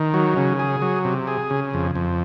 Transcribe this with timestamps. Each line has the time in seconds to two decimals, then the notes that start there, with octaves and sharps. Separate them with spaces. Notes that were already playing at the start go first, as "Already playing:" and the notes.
Already playing: D#3
0.14 F#3
0.37 C#3
0.59 G#4
0.82 F#3
1.05 C3
1.27 G#4
1.50 C#3
1.74 F2
1.95 F2